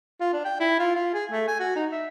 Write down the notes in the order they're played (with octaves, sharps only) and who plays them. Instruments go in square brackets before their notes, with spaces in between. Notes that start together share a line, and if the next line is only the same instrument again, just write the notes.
[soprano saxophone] F4
D4
G5
E4
F4
F4
G#4
A3
G#5
F#4
D#4
E5